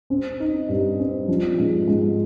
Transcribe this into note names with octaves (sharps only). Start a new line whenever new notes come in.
C4
D#4
G2
C4
F3
G#2
G#2